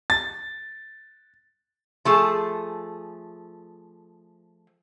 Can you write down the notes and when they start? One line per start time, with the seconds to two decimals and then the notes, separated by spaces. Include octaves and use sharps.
0.10 A6
2.05 F3 A3 G#4